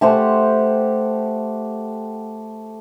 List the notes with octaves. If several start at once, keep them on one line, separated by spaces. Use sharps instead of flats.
A3 G4 C5 F#5